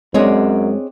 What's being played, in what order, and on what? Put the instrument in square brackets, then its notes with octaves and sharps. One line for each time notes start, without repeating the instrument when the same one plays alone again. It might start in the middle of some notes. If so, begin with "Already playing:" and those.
[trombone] F#2 [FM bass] G#3 [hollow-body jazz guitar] C4 D4 [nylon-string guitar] G#4 C#5 D#5